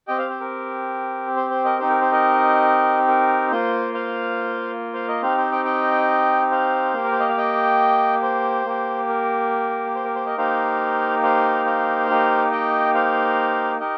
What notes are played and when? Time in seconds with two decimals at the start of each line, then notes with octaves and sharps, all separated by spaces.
0.07 C4 G4 D#5 G5
0.18 C5 F5
0.30 C5
0.40 A#4
1.36 C5
1.50 C5
1.65 A#4 D#5
1.79 C4 D#4 G4 C5
1.90 A#4
2.01 C5
2.12 A#4 D#5
3.08 A#4
3.51 A#3 F4 C5
3.94 C5 F5
4.93 C5 F5
5.08 A#4 D#5
5.22 C4 D#4 G4 C5 F5
5.37 C5
5.51 D#5 G5
5.65 D#5 G5
6.51 C5 F5
6.94 A#3 G4
7.04 A#4
7.12 C5
7.20 D#5
7.29 F5
7.37 D#5 G5
8.22 C5
8.65 A#3 G4
9.09 A#4
9.95 C5
10.05 A#4
10.15 C5
10.26 A#4 D#5
10.38 A#3 D#4 G4 C5 F5
11.23 C5 F5
11.65 C5 F5
12.09 A#3 D#4 G4
12.51 D#5 G5
12.94 C5 F5
13.80 D#4 G4 A#4 D#5